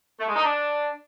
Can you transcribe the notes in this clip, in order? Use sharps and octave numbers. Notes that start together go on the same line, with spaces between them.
A3
G#3
D#4
D4